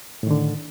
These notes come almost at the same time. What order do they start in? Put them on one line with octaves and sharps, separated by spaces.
A2 D#3 D3